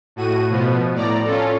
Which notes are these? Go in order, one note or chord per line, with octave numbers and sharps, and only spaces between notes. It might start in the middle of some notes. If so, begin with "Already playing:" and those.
A2 F#4 D#7
B2 F3 B3
A2 D5 A#5
C#4 F4 A4